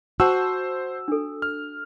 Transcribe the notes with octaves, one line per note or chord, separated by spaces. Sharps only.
F#4 C5 F#5 A5 E6
D4 A4
F6